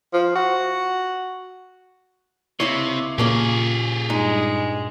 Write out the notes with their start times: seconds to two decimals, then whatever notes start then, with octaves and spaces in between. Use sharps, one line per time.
0.13 F3
0.36 F#4
2.60 C#2 C3 E4 C#5
3.18 A#2 C#3 A#3 C#4 G4 G#4
4.10 G2 G#3 D#4